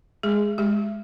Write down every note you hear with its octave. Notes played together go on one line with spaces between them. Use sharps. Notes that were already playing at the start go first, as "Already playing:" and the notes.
G#3 G#4
G#3 G4